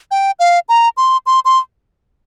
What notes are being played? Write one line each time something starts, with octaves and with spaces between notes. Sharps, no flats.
G5
F5
A#5
C6
C6
C6